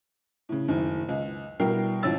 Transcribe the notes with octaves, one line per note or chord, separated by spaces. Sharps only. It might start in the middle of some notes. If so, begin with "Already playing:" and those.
A2 C#3
F#1 A2 D#3
C#2
B2 G3 E4 A#4 G5 C7
G#1 E3 F3 C#4 E6 A6